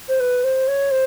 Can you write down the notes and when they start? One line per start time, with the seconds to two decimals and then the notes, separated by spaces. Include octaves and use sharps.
0.08 C5
0.20 B4
0.43 C5
0.67 C#5
0.91 C5